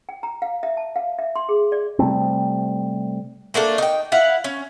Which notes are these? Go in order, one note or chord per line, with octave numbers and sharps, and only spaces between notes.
G5
A#5
F5
E5
A5
F5
E5
C6
G#4
D5
C3 G3 A3 C4
A3 A#3 D4 A4
D#4 G5
E4 F5 F#5
C#4